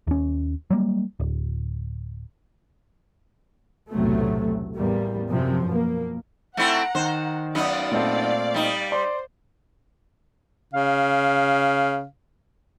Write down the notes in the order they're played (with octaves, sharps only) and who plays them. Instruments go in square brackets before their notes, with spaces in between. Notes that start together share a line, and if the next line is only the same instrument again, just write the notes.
[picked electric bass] D#2 C#4
F#3 G3 A#3
D1
[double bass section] B1 E2 A2 C3 F#3 A3
A1 E2 G3 A#3
F#2 C3 F3
B2 A#3
[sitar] A3 C4 E4 [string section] F#5 A#5
[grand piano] D#3 [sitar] C5
[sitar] F#2 B3 D#4 [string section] D5 F5
[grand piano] A#2 A3 C4
[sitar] G3 D#4
[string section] C5 [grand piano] D5 C6
[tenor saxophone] C#3 [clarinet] F5